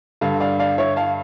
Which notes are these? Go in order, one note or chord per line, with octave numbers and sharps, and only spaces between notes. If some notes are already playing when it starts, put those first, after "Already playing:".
G2 D3 F5 A5
D5 F5
D5 F5
C#5 E5
F5 A5